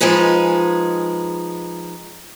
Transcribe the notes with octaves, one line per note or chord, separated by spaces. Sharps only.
F3 G#3 D#4 G#4 B4